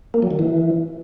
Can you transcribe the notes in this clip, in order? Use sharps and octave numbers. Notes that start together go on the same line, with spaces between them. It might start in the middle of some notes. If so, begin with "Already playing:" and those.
A#3
F#3
D#3
E3